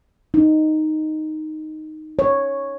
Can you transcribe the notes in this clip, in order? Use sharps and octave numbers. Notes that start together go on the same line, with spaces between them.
D#4
C#5